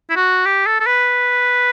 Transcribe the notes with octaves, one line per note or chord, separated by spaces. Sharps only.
E4
F#4
G4
A4
A4
B4